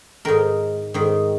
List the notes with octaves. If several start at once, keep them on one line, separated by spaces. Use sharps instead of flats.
G#2 D#3 A#4
G#2 D#3